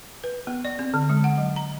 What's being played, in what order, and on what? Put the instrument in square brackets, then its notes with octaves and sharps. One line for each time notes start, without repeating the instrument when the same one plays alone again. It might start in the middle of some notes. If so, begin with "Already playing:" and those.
[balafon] B4
B3
D5
C4
D3
G#3
F#5
F#3
A#5